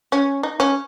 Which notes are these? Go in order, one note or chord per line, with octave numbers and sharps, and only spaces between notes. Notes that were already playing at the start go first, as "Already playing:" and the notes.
C#4
D#4
C#4